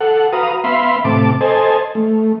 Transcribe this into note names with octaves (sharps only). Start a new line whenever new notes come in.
A4 F#5
F#4 B4 F5 A#5 D#6
B3 E5 F5 B5 C6
A2 C3 A5 D6
A4 C5 D#5 G#5 A5
A3